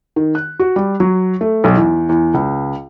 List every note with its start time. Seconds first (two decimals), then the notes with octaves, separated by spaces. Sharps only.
0.16 D#3
0.35 F#6
0.59 F#4
0.76 G3
1.00 F#3
1.41 A3
1.64 B1
1.76 E2
2.09 E2
2.34 C#2